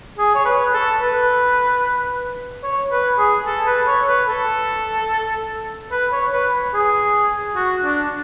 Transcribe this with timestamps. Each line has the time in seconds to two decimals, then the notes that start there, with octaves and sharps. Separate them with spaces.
0.18 G#4
0.35 C#5
0.45 B4
0.73 A4
1.00 B4
2.63 C#5
2.91 B4
3.18 G#4
3.46 A4
3.66 B4
3.87 C#5
4.08 B4
4.28 A4
5.91 B4
6.12 C#5
6.33 B4
6.74 G#4
7.56 F#4
7.83 D4